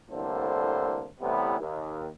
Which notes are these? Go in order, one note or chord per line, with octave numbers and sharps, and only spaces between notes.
C2 A2 D3 A#3 A4 C5
A2 C3 E3 G3 B3
D#2